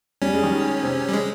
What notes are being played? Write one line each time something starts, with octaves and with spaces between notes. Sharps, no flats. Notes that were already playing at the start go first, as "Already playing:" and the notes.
G3 C#4
G#3
D#3 G3
C3
G3
G#3